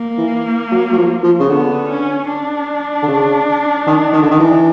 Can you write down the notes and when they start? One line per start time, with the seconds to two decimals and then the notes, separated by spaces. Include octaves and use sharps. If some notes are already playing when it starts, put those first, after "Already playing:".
Already playing: A#3
0.18 E3
0.71 F#3
0.92 F#3
0.98 F3
1.23 F3
1.40 C#3
1.49 D3 B3
1.90 C#4
2.29 D4
3.03 D3
3.08 C#3
3.87 D#3
4.13 D#3
4.22 D3
4.31 D#3
4.39 E3